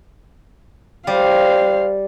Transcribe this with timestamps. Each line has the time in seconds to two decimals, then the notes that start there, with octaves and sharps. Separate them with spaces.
1.07 G3 C5 F5